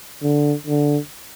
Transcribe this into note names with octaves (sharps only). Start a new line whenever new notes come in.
D3
D3